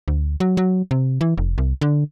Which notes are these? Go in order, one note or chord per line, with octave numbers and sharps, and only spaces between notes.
D2
F#3
F#3
C3
E3
F1
C2
D3